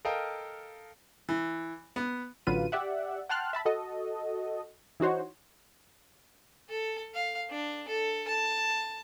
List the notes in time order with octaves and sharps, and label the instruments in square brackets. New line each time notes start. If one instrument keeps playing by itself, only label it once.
[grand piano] A4 A#4 D#5 F5 G5
[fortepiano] E3
B3
[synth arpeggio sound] A1 D3 F#3 F4 B4 D#7
G4 D5 E5 F#5
F#5 G5 A5 C6 F6 F#6
E5 A5 B5
F#4 A4 D#5
E3 D#4 F#4 C5 C#5
[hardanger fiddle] A4
F5
D4
A4
A5